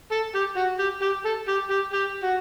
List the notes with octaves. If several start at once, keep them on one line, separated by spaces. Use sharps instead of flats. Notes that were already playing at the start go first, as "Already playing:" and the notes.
A4
G4
F#4
G4
G4
A4
G4
G4
G4
F#4